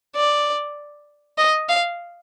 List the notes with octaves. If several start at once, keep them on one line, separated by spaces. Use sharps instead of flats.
D5
D#5
F5